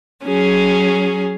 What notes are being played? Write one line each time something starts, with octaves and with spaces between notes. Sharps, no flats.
F#3 C#4 G#4